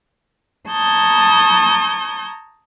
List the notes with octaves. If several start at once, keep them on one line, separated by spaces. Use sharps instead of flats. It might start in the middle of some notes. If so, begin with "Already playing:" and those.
A5 A#5 C#6 D#6 G6 G#6